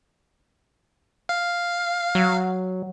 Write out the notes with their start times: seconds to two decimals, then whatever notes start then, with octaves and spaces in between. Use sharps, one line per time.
1.29 F5
2.15 F#3